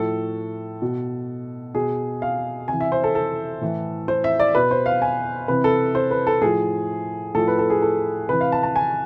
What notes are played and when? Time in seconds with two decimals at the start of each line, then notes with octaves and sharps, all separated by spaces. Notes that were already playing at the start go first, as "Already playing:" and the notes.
Already playing: A2 F3 A4
0.82 B2
1.75 B2 G#4
2.22 F5
2.68 C3 E3 G#5
2.81 E5
2.92 C5
3.04 A4
3.15 A4
3.61 A2 E3
4.08 C5
4.24 E5
4.40 D5
4.55 B2 B4
4.71 C5
4.86 F5
5.02 G#5
5.48 C3 E3 B4
5.64 A4
5.95 C5
6.11 B4
6.27 A4
6.42 A2 F3 G#4
7.35 A2 F3 A4
7.48 B4
7.59 A4
7.70 G#4
7.82 A4
8.29 C3 E3 B4
8.41 F5
8.52 A5
8.63 A5
8.76 G#5